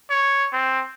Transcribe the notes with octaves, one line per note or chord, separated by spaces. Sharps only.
C#5
C4